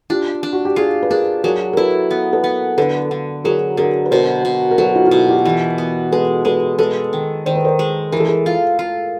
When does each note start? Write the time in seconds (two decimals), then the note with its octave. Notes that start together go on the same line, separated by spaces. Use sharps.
0.10 D4 F4 G4
0.43 D4
0.53 F#4
0.65 G4
0.76 F4 F#4 G#4
1.02 B4
1.10 D4 G#4 A#4
1.44 F#3 G#4 A#4
1.73 A#4
1.77 E4 A4 B4
2.11 B3
2.33 A4 B4
2.44 B3
2.78 D3 A4 B4
3.11 D3
3.44 F#3 G#4 A#4
3.77 D3 G#4 A#4
4.06 B4
4.11 B2 A#4 C5
4.45 B2
4.71 A#4
4.78 F#3 A4 B4
4.95 D#4 F4
5.06 F4
5.11 B2 E4 F#4
5.29 F4 G4
5.45 E3 F4 G4
5.78 B3
6.12 G#3 A4 B4
6.45 G#3 A4 B4
6.79 G#3 A4 B4
7.13 D#3
7.46 D#3 C5
7.55 B4
7.65 A#4 C5
7.79 G#3
8.12 E3 A#4
8.20 A4
8.28 G#4 A#4
8.46 F4
8.79 F4